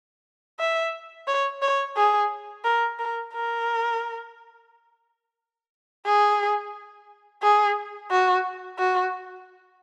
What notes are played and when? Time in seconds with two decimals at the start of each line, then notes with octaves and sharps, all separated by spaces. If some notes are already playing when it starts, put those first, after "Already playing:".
0.59 E5
1.28 C#5
1.62 C#5
1.96 G#4
2.64 A#4
2.99 A#4
3.33 A#4
6.06 G#4
7.42 G#4
8.11 F#4
8.79 F#4